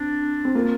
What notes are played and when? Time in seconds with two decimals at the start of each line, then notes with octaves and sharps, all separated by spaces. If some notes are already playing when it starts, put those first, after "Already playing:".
Already playing: C4 D4
0.45 C4
0.55 A#3 F4